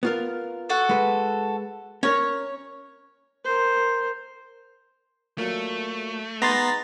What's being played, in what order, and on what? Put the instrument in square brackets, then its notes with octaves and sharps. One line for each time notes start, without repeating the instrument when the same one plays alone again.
[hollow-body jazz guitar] B3 F4 A#4
[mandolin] F#4 A4 F#5
[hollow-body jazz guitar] G#3 B4
[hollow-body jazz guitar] C#4 A#4 [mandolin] C#5
[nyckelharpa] A#4 C5
[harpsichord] A#2 F#3 [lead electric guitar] A3
[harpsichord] G#3 D#4 [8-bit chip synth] B3 [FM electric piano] A#5 C6 A6